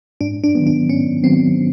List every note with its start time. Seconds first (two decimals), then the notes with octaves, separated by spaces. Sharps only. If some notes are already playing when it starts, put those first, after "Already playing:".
0.21 G#2 D4
0.44 D4
0.55 D#3 F#3 B3
0.67 D4
0.89 G#2 C#4
1.23 D#3 F#3 B3 C4